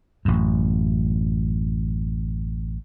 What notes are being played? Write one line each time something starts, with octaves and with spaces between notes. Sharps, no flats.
A1 F#2